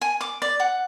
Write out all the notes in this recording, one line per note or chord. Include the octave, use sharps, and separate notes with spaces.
G#5
D6
D5
F#5